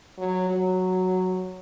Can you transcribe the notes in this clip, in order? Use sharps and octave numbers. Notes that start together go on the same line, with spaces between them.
F#3
F#3